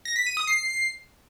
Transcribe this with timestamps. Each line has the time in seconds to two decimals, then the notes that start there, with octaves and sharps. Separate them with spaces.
0.05 A#6
0.16 B6
0.26 D#7
0.37 D#6
0.47 C7